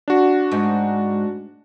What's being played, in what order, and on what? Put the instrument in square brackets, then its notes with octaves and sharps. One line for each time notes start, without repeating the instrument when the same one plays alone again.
[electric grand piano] D4 F#4
[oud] G#2